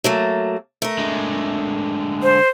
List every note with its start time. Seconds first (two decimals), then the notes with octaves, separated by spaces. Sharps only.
0.04 F#3 A3 A#3
0.82 A3 A#4
0.99 D3 G#3
2.23 C5